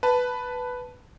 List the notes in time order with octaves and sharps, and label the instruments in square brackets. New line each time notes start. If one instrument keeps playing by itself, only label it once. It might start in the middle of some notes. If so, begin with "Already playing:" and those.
[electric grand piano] B4 A5